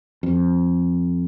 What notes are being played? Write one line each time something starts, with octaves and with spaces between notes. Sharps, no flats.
F2